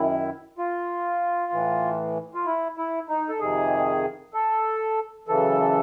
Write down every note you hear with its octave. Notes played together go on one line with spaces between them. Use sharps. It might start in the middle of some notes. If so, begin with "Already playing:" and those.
Already playing: F#2 D#3 E4
F4
A2 E3
F4
E4
E4
D#4
A4
F2 C3 D#3 G#4
A4
F#2 C#3 E3 A4